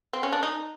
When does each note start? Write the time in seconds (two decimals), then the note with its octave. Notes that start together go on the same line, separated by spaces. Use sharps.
0.13 C4
0.23 C#4
0.33 D4
0.43 D#4